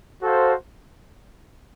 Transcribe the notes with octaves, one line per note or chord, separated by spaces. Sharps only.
F#4 A4 C5 F5